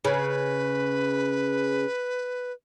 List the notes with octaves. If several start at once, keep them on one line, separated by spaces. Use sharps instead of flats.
C#3 B4